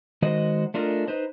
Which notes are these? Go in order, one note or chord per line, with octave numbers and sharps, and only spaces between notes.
D#3 G#3 F#4 C5 D#5
A3 D4 F4 A#4 D#5
D#4 B4 C5 D#5